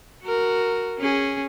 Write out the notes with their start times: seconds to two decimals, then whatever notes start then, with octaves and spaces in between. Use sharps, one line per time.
0.23 F#4 A#4
0.98 C#4 G#4